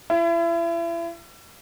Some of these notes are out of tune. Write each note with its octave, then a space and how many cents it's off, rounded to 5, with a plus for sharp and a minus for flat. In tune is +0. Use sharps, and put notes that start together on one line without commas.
E4 +35